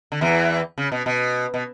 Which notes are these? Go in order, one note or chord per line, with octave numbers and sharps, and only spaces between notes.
D3
E2 E3
C#3
B2
B2
B2